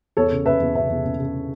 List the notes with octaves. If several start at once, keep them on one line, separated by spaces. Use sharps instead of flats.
E2 A4 C#5
C#3
C#3 B4 E5
E2
C#3 B4 E5
E2
C#3
C#3